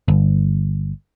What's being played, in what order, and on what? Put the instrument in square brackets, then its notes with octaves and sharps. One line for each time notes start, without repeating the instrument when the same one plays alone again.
[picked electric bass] G1